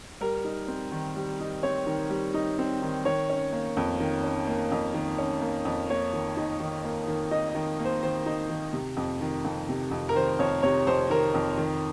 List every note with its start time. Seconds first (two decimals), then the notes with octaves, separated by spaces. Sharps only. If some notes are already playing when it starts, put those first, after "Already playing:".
0.21 G3 A#4
0.45 D#4
0.68 C4
0.92 D#3
1.16 G3
1.40 D#4
1.63 C4 C#5
1.87 D#3
2.10 G3
2.34 D#4
2.59 C4
2.82 D#3
3.05 D#3 C#5
3.30 C#4
3.52 A#3
3.77 F2
4.00 D#3
4.24 C#4
4.47 A#3
4.72 F2
4.94 D#3
5.18 C#4
5.42 A#3
5.65 F2
5.90 A#3 C#5
6.13 D#3
6.37 D#4
6.60 D#3
6.84 A#3
7.08 D#3
7.31 D#4 D#5
7.49 D#5
7.55 D#3
7.79 A#3
7.85 C5
8.03 D#3 C5
8.26 D#4
8.50 D#3
8.73 C3
8.97 F2
9.21 D#3
9.45 F2
9.69 C3
9.91 F2
10.09 A#4
10.15 D#3 C5
10.39 F2 C#5
10.63 C3 C#5
10.87 F2 C5
11.10 D#3 A#4
11.34 F2
11.57 D#3